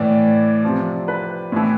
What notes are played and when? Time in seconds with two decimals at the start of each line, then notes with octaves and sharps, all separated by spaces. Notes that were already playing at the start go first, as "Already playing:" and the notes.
Already playing: A2 E3 D5
0.64 C3 F3
1.08 B4
1.52 A2 E3